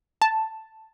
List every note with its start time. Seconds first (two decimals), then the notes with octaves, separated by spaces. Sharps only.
0.22 A5